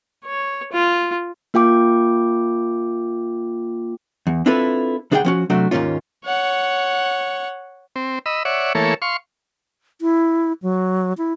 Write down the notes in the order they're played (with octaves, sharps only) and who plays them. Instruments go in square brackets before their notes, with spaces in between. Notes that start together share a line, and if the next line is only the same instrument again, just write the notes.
[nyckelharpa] C#5
F4
[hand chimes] A#3 F4 G5 D6
[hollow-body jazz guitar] E2
C4 D4 E4 F4 A4 B4
D2 D4 G#4 E5 F#5 G5
F3 C#4 F#4
C3 F#3 A3 D4 F#4
D#2 G#2 B2 A#3 C#4 F4
[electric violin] C#5 F#5
[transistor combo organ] C4
D#5 B5 E6
C#5 D5 E5 F#5
E3 A3 A#3 A4 C#5
F5 C6 C#6
[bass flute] E4
F#3
E4